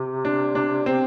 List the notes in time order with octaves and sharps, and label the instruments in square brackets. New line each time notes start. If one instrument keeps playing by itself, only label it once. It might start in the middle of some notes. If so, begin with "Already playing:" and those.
Already playing: [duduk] C3
[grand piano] D4
D4
C4